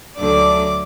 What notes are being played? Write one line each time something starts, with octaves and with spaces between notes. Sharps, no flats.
D2 D3 F#3 A3 D5 D6